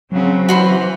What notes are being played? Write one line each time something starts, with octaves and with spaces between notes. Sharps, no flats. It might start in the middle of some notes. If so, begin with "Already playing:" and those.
C#3 F#3 C4
E3 F#4 C5 B5